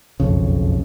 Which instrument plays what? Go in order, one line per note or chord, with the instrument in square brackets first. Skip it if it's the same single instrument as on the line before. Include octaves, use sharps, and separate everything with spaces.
[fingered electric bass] F#1 B1 F2 C#3